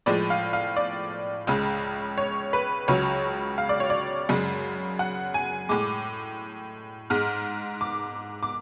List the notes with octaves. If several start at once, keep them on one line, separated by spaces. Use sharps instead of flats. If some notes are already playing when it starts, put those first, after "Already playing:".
A2 F3 G#3 D5
F5
F5
D5
C#2 C#3 G#3
C#5
B4
C#2 C#3 F#3 C#5
F5
D5
C#5
D5
F#2 C#3 G#3
F#5
G#5
A2 G#3 D6
G#2 G#3 F6
D6
D6